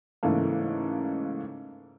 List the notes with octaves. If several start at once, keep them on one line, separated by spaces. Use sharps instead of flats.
G#2 C#3 E3 A3 A#3